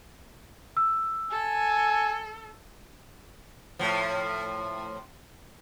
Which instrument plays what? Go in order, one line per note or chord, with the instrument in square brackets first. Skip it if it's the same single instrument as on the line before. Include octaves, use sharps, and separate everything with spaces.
[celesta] E6
[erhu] A4 [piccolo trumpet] G#5
[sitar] A2 F3